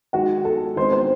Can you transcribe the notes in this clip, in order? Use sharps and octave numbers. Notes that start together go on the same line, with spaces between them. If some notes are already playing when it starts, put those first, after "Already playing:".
D#3 G#3 D#4 F#4 F#5
A4 A5
D#3 G#3 C4 D#4 C5 C6
C5 C6